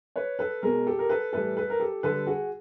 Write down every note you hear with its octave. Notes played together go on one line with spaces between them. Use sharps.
B4 C#5
A4 B4
B2 G#3 G#4 A#4
G4 A4
A#4
A4 B4
A2 E3 G3 A4 B4
A4 B4
A#4
G4 A4
D3 G3 A4 B4
F#4 G#4